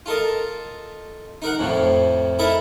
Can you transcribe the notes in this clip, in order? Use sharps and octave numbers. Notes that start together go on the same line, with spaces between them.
F4 A4 A#4 D#5
D#4 A#4 F#5
F2 A2 F3
E4 A4 A#4 D#5 E5